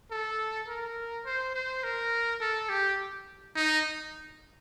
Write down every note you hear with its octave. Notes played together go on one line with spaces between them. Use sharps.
A4
A#4
C5
C5
A#4
A4
G4
D#4